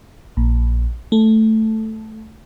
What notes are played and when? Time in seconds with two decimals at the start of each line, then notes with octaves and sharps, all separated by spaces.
0.37 A#1
1.12 A3